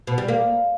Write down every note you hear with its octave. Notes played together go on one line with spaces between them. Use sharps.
B2
G3
A#3